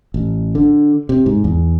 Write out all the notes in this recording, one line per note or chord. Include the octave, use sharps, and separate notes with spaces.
A1
D3
C3
G#2
E2